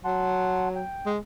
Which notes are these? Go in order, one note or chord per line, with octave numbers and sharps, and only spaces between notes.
F#3 F#5 A5 C6
G5
G#3